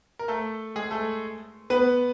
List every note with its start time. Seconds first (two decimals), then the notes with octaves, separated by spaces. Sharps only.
0.19 A#4
0.28 A3 A4
0.76 G#3 G#4
0.91 A3 A4
1.70 B3 B4